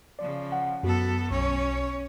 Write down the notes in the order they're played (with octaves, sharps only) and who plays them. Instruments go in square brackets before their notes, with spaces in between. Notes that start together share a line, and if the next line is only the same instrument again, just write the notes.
[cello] C#3 F3 [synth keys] D5
[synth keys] F#5
[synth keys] F#2 F#4 [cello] B3 A4
[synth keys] B1 [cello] C#4 C#5